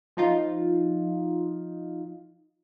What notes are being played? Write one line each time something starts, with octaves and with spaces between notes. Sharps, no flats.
F3 D#4 F4